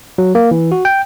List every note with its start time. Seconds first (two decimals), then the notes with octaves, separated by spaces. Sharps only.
0.18 F#3
0.35 A#3
0.51 E3
0.72 F#4
0.85 G5